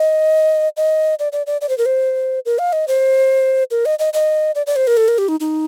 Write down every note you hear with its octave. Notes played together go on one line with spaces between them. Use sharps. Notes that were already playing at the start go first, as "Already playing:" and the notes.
Already playing: D#5
D#5
D5
D5
D5
D5
C5
A#4
C5
A#4
F5
D#5
C5
A#4
D#5
D#5
D#5
D5
D5
C5
A#4
A4
A#4
G4
D#4
D#4